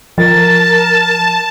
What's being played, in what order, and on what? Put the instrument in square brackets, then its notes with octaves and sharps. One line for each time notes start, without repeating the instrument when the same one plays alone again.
[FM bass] F3 [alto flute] A#4 [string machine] A5 [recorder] A6